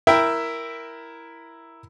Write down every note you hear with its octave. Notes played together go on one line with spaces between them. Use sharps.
E4 A#4 E5 G5